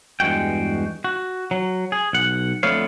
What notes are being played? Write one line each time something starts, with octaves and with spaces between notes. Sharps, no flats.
E2 G2 G#3 F#4 G5
F#4
F#3
G#4
B1 F#5
F2 D3 A3 B3 C#5 F5